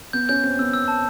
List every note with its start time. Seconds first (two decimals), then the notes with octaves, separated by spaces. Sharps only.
0.13 B3 G6
0.29 C#4 G6
0.44 C4 G6
0.59 B3 E6
0.74 E6
0.88 A5